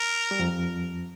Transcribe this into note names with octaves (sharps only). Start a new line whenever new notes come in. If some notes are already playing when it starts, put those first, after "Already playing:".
Already playing: A#4
G3
F2 F3